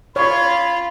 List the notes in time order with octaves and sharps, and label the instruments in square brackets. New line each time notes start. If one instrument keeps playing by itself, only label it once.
[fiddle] F4 [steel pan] C#5 [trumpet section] B5